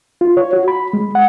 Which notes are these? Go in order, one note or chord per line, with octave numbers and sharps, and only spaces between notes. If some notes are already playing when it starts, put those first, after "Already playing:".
F4
C#5
F#4
B5
G#3
F#5